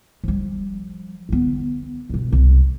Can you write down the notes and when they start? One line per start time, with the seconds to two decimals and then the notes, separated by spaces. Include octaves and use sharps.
0.24 F3 G3
1.29 D3 B3
2.09 G2 B2
2.32 C2